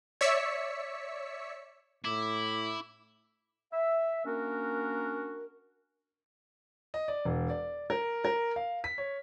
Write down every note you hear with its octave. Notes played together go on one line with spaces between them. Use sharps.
C#5 D5 E5 E6 B6 C#7
A2 E4 D6
E5
A#3 C#4 D4 F#4 A#4
D#5
D5
E1
D5
A#4
A#4
F5
B6
C#5